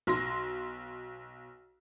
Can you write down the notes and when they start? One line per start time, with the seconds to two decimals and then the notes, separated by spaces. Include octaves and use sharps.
0.07 B1 C6 A#6